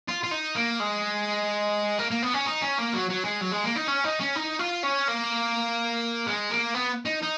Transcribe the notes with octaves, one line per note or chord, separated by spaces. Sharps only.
F4
F4
D#4
A#3
G#3
A#3
A#3
B3
C#4
D#4
C#4
A#3
F#3
F#3
G#3
F#3
G#3
A#3
D#4
C#4
D#4
C#4
D#4
F4
C#4
A#3
G#3
A#3
B3
D#4
D#4